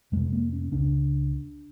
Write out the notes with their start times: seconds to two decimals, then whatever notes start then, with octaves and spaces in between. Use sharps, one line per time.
0.12 F2 C3 G#3
0.33 A#3
0.53 C#4
0.72 C#2 C#3 D4